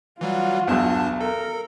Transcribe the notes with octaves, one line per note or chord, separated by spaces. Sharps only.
E3 F#3 G3 F4 F#4
B1 E2 G2 D4 A5
A4 A#4